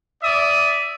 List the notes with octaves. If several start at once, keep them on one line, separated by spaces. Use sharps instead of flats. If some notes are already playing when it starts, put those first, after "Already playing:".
D5 E5 D#6